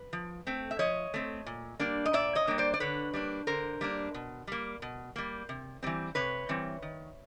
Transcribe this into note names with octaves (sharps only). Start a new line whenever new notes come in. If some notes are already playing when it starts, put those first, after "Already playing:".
Already playing: B4
F3
A3 C4
E5
F3 C#5 D#5
A3 C4
A#2
G3 A#3 D4
D#5
A#2 D5 E5
C#5 D#5
G3 A#3 D4
C5 D5
D5
D3 B4 C#5
G3 A#3 D4
D3 A#4 C5
G3 A#3 D4
B2
G3 A#3
B2
G3 A#3
C3
E3 G3 C4
C3 B4 C#5
E3 G3 C4
D#3